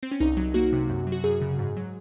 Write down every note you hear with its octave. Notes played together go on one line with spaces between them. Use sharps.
C4
C#4
C2 D#4
F#3
A#3 F#4
C3
F#2
F#3
F#4
F#2 G#4
C#3
G#2
F#3